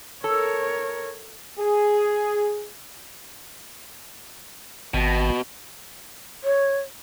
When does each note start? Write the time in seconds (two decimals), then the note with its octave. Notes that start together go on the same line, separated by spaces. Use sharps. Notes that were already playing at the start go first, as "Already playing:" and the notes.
0.24 A4 A#4 C#5
1.59 G#4
4.94 G#1 B2
6.44 C#5